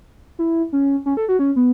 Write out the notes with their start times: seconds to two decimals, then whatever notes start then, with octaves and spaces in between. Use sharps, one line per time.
0.39 E4
0.73 C#4
1.06 C#4
1.17 A4
1.29 F#4
1.39 C#4
1.56 B3